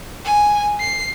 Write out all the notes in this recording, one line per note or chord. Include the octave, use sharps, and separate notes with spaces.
G#5
C7